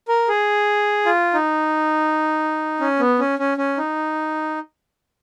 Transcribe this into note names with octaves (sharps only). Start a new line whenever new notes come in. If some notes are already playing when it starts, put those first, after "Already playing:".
A#4
G#4
F4
D#4
C#4
B3
C#4
C#4
C#4
D#4